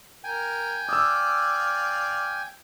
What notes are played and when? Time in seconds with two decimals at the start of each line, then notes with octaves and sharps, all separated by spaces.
0.24 A#4 G5 G#5
0.89 D5 F5 D#6 E6